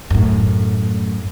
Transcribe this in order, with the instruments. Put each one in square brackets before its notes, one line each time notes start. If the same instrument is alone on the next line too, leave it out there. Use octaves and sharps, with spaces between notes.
[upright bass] F#2 A2